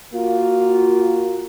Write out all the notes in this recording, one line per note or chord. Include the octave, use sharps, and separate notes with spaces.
A#3 F4 F#4